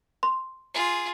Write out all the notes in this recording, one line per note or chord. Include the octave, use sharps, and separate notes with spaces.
C6
F4 G#4